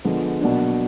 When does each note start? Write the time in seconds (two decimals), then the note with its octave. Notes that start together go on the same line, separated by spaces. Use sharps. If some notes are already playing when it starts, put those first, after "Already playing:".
0.04 D3 F3 G#3 B3
0.41 B2 F#3 A#3 D4